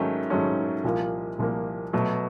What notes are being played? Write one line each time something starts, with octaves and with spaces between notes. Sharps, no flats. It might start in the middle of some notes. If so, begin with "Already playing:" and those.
Already playing: G#2 D#3 F#3 A3 C#4
G#2 D#3 F#3 A3 C#4
C2 A#2 F3 A#3
C2 A#2 F3 A#3
B2 F#3 A3